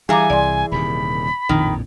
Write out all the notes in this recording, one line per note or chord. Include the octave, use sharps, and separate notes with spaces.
E3 G3 G#4 F5 G#5 A#5 D6
C2 D5 C6
D#1 C3 D#3 B5
A#1 F2 A2 D#3